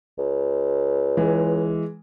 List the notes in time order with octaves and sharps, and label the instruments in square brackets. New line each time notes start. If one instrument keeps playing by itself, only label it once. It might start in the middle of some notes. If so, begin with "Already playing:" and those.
[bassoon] C#2
[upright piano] E3 G#3